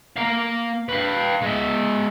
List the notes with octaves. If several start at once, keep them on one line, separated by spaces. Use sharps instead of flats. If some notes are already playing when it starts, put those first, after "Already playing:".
A#3 F5
B4 F5
G#3 E5